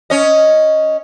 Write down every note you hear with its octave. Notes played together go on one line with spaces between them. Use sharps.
C#4 D#5